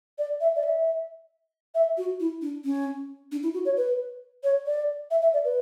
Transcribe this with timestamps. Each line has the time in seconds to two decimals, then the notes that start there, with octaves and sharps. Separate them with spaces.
0.18 D5
0.40 E5
0.55 D5
0.63 E5
1.74 E5
1.97 F#4
2.20 E4
2.41 D4
2.64 C#4
3.31 D4
3.43 E4
3.54 F#4
3.65 C#5
3.76 B4
4.43 C#5
4.66 D5
5.10 E5
5.22 E5
5.33 D5
5.44 B4